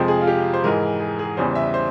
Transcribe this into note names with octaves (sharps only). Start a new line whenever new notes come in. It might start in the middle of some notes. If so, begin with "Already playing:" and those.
Already playing: F2 C3 F3 G#3 C5
G#4
F4
G4
C5
G#2 E3 G#3 A#4
G#4
G#4
E2 C#3 E3 G3 C5
E5
C5